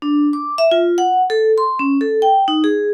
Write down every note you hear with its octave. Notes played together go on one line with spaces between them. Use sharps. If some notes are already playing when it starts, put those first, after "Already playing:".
D4
D6
E5
F4
F#5
A4
C6
C#4
A4
G5
D#4
G#4